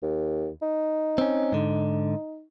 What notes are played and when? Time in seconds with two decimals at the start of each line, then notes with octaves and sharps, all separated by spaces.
0.03 D#2
0.62 D#4
1.18 C4 C#4
1.52 G#2 D3